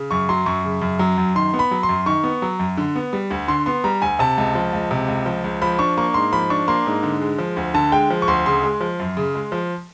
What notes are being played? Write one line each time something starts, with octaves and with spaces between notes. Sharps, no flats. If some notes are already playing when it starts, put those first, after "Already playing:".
Already playing: C#3
F#2 C#6
F#3 C6
F#2 C#6
C#3
F#2
F#3
F#2
D#3 C6
B3
B5
F#3
C6
F#2
D#3 C#6
B3
F#3
F#2
D3
B3
G3
D2
D3 C6
B3 C6
G3 A#5
D2 G#5
C3 A5
C#2
F3
C#2
C3
C#2
F3
C#2
F3 B5
D4 C#6
A#3 C#6
G#2 C6
F3 B5
D4 C#6
A#3 C6
G#2
D3
G#3
F3
D2
D3 A5
G#3 G5
F3
C#6
D2 C6
C#3 C6
G#3
F3
F#2
C#3
G#3
F3